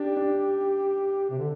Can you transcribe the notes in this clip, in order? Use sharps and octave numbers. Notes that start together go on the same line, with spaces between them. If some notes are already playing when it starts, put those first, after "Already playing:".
Already playing: D4 G4
D4
C3
D3